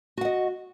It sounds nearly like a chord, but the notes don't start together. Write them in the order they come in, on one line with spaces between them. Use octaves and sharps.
F#4 F#5 D#5